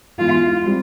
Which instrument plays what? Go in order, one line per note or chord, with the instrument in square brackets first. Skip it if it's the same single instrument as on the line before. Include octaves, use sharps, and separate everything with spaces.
[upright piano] E2 E3 G#3 [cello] F4
[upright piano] G3 C4